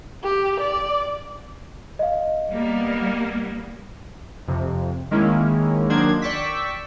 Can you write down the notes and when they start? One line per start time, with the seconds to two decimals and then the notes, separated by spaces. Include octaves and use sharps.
0.24 G4
0.60 D5
1.99 D#5 F5
2.52 G3 A#3 B3
4.48 F2 C3
5.11 D#3 G#3 A#3 C#4 E4
5.90 D#3 F#3 A#3 D4 C5 G#6
6.22 D5 G5 C#6 D6 E6 B6